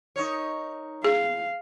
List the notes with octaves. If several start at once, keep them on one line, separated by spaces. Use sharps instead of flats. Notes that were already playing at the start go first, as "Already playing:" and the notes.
D#4 A#4 C#5
G#4 F5